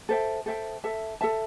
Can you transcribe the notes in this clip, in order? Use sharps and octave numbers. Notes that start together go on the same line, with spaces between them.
A4 C5 E5 G5
A4 C5 E5 G5
A4 E5 A5
A4 E5 A5